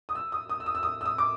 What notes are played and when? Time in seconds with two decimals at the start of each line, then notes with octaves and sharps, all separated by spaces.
0.09 D#6
0.15 E6
0.32 D#6
0.49 D#6
0.60 E6
0.66 D#6
0.75 E6
0.83 D#6
1.01 E6
1.06 D#6
1.18 D6